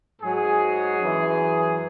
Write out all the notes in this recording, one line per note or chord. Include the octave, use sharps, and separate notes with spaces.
G#2 F#3 G#4
F#2 E3